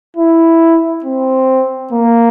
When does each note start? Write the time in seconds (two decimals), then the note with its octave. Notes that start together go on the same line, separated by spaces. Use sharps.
0.17 E4
1.04 C4
1.92 A#3